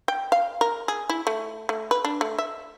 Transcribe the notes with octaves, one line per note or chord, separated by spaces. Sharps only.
G5
F5
A#4
G#4
E4
A3
A3
B4
D4
A3
E5